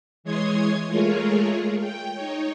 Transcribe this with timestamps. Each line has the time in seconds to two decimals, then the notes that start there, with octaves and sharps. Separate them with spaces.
0.24 E3 G#3 C#5 C6 D#6 G#6
0.87 G#3 A3 F4 G#4 A#4 C#5
1.80 G5
2.15 D#4 C#5